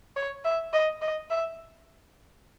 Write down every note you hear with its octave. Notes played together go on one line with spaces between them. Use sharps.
C#5
E5
D#5
D#5
E5